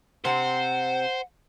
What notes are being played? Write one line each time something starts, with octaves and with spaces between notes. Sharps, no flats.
C3 C4 C5 F#5